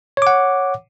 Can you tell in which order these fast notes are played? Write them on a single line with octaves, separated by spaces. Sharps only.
C#5 D6 F#5